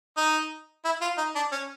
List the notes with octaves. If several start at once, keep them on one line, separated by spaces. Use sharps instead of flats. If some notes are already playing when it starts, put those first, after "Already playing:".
D#4
E4
F4
D#4
D4
C#4